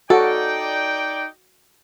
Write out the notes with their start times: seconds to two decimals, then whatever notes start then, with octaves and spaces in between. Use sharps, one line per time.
0.10 D#4 F#4 A4 D5 G5